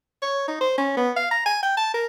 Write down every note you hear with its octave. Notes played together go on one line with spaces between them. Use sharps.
C#5
D#4
C5
C#4
B3
F5
A#5
G#5
G5
A5
A#4